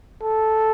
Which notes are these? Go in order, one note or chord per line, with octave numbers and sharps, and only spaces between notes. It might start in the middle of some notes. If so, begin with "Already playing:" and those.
A4